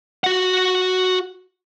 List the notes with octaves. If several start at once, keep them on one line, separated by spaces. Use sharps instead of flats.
F#4 F#5